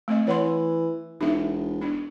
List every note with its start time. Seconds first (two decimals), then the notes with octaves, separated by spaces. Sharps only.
0.08 A3 C4 D#5
0.27 E3 C#5 F#5 C6
1.21 E1 D#4 E5
1.82 D4